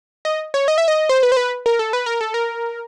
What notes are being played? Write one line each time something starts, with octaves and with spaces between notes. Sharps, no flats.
D#5
C#5
D#5
E5
D#5
C5
B4
C5
B4
A#4
A4
B4
A#4
A4
A#4